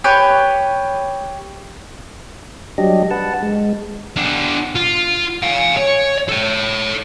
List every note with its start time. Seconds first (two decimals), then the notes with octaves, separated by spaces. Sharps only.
0.04 G4 B4 C#5
2.78 F#3 G3 D4 G4 D#5
3.11 B4 F#5 A5
3.43 G#3
4.16 B3 D4
4.76 F4
5.43 F5 G#5
5.77 C#5
6.29 A4 C#5